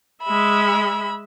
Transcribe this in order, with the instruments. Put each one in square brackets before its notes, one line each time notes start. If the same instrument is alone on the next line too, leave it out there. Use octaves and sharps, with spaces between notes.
[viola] G#3 E5 [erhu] B5